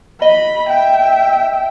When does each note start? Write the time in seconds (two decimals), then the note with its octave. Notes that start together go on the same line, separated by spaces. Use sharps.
0.22 D#5 B5
0.68 E5 G5